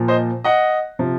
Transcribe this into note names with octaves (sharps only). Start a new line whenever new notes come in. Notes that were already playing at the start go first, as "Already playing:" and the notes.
Already playing: A#2 F3
C5 D#5
D#5 F#5
C3 F3